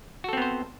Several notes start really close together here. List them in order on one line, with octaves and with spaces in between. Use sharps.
F#4 A4 C4 B3 C5